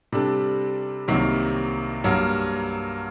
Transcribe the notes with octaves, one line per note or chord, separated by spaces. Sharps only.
C3 G3 D4 A4
C2 C3 D#3 F#3 A#3
G2 F#3 A#3